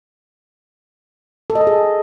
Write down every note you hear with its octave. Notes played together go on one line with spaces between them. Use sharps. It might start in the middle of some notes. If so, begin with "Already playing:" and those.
A4
D#5
A4
G#4